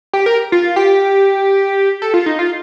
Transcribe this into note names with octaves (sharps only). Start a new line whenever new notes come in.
G4
A#4
F4
G4
A4
F4
D#4
F4